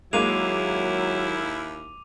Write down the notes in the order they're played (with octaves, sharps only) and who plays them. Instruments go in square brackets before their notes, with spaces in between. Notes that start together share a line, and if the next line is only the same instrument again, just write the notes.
[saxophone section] D#2 E4 [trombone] F#3 [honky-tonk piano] G#3 A#3 [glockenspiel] D6 D#7 F7